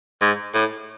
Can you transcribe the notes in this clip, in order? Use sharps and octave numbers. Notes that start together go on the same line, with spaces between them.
G#2
A2